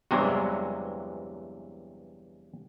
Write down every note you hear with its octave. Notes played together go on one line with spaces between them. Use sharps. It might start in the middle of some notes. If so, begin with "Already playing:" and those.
E2 G2 C3 E3 F#3 G#3